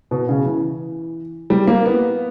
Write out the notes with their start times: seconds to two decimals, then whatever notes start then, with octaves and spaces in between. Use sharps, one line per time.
0.11 B2
0.29 C#3
0.46 E3
1.50 G3
1.67 A#3
1.86 B3